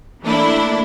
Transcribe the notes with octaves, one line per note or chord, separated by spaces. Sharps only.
E3 A3 A#3 D4 E4